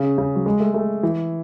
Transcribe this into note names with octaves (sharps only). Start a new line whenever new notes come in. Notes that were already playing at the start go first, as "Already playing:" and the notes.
Already playing: C#3
C#3
F#3
G#3
A3
A3
E3